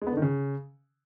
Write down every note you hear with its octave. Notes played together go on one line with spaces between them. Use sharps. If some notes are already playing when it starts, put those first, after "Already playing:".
G#3
B3
D3
D#3
C#3